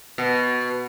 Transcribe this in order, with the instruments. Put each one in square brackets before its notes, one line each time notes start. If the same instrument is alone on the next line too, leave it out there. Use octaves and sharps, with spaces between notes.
[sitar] B2